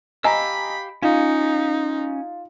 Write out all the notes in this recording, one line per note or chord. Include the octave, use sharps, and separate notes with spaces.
G4 D#5 F5 G#5 A#5 B5 E6
C#4 D#4 F4